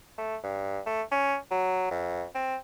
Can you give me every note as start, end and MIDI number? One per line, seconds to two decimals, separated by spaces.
0.18 0.37 57
0.43 0.80 43
0.86 1.02 57
1.12 1.36 61
1.51 1.90 54
1.91 2.25 41
2.35 2.56 60